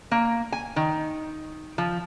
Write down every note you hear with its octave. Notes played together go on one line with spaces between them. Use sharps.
A#3
G#5
D#3
F3